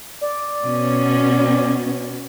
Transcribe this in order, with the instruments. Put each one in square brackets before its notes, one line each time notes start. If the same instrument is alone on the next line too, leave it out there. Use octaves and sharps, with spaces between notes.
[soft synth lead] D5
[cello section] B2 B3 C#4